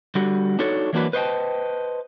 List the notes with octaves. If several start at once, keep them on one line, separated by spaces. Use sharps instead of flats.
D3 G3 F#4
D4 D#4 F#4 A4 C#5
E3 F#3 A#3 D4 F#4 B4
B4 C5 D#5 F5 G5 A5